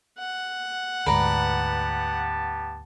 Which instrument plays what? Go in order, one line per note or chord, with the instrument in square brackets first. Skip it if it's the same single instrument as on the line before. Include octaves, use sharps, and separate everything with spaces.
[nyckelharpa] F#5
[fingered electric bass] D2 G#2 [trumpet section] B3 G4 A5 [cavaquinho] B4 D5 A#5